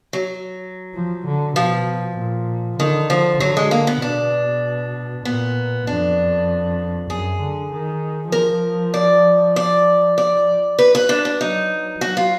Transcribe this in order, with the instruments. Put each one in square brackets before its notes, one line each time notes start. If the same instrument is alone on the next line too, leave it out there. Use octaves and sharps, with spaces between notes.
[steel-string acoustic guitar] F#3
[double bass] F3
D3
[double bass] B2 [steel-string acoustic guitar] F3
[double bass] A#2
[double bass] D3 [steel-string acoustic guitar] D#3
[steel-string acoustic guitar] F3
[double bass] D3 [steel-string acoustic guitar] F#3
[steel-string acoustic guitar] G#3
A#3
B3
[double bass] B2 [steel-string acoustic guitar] D4
[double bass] A#2 [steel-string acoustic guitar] B3
[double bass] F2 [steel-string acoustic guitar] D4
[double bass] F#2 [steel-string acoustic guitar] G#4
[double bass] D3
D#3
[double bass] F3 [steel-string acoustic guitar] A#4
[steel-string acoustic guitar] D5
D5
D5
B4
B4
D4
D4
[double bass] F#3 [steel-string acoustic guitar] D#4
[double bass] F#3 [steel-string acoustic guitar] F#4
[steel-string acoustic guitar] F4